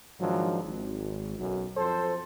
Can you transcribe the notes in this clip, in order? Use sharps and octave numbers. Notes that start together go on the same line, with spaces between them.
G#2 D#3 F3 F#3 D4
G#1
B1 F#2
F2 A4 C5